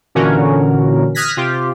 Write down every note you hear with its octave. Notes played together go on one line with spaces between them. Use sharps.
A#2 D3 E3 C#4 F#4 A#4
D#6 F6 F#6 G#6 A#6 B6
C3 F4 G4